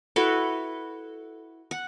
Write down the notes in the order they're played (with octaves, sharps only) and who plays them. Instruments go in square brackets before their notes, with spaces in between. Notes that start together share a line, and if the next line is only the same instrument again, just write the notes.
[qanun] E4 F#4 B4 [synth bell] A4
[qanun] F#5